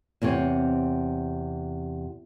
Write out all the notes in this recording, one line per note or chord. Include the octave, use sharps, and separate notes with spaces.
E2 C3 C4 C#5